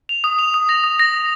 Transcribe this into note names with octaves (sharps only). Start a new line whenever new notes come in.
F7
D#6
F7
D#6
A#6
D#6
A#6
D#6